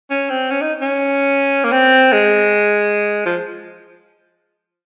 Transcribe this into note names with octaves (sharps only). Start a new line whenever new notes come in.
C#4
C4
C#4
D#4
C#4
A#3
C4
G#3
F3